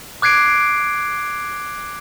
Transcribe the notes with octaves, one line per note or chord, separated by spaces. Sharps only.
D6 F#6 G#6 C7 D7